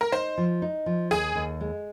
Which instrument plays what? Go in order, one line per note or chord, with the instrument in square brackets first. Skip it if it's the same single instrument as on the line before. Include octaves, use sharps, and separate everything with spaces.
[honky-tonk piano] A#4
[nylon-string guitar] D#4 [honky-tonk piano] C5
[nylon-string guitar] F3
D#4
F3
[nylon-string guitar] D#2 [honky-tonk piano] G#4
[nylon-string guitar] D#2
G#3